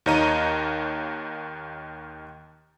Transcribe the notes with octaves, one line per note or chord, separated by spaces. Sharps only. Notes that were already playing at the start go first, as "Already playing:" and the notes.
D#2 D#3 C#5 D#5 A#5 D#7